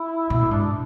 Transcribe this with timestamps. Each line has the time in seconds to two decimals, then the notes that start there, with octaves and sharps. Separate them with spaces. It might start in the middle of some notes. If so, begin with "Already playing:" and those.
Already playing: E4
0.30 B2 E4
0.41 A2
0.51 G#2 D4